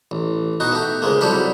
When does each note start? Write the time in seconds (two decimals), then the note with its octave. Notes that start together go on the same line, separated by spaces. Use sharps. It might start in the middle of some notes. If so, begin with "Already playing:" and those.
0.11 A1
0.60 B2 D#4 F#4
0.72 A3 G4
1.02 C#2 G#2 G#3 A#3
1.21 C2 F#3 G3 G4 A4 B5